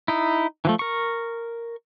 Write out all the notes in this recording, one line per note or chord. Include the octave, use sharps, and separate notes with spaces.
D#4 E4
E3 F3 A3
A#4 C#6